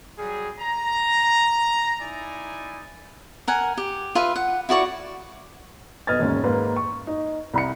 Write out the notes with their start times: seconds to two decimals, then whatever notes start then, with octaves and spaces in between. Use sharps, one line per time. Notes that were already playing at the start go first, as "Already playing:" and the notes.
0.18 F#3 G3 G#4
0.60 A#5
2.01 D#4 E4 D5 G#5
3.48 A#4 F#5 G#5
3.78 G4
4.15 F4 B4 E5
4.36 F#5
4.69 E4 F#4 D5 C#6
6.07 B1 B4 D#5 F6 G#6 A6
6.19 E1 D#2 G#2 C#4
6.44 G#2 A#3 B4
6.76 C#6
7.07 D#4
7.53 C2 B5 C#7